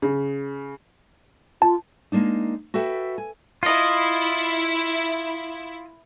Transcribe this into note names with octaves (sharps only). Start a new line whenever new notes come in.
C#3
F4 A5
G#3 A#3 D4 D#4
F#4 A4 B4 E5 G5
G#5
E4 F4 D#5